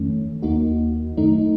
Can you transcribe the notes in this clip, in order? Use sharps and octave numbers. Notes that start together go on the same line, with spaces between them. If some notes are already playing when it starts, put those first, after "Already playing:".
Already playing: F2 D#3 A3 C#4
D#2 D#3 A#3 D#4 F#4
F#2 D#3 A3 D#4